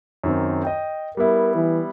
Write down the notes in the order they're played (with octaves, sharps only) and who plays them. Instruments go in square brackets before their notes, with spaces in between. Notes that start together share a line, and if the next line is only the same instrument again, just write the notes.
[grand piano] F#2 D#3 C4
D#5 G5
[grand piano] G3 B3 E4 [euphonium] A#4
[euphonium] E3